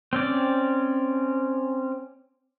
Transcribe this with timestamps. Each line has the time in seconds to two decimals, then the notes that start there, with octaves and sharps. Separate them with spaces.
0.13 C4 C#4 D5